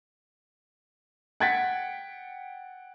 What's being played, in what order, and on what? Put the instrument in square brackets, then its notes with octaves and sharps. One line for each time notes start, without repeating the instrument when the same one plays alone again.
[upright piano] F#5 G5 G#6 A6 B6